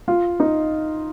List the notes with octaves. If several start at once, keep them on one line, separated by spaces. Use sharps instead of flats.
F4
D#4